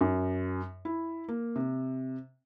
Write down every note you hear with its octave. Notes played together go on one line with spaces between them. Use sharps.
F#2
E4
A#3
C3